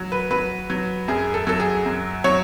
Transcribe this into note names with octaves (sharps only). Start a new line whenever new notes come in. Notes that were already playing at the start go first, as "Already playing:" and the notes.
Already playing: F#3
B4
F#3 B4
F#3
F#2 G#4
A4
F#3 A4
G#4
F#2
F#3 C#5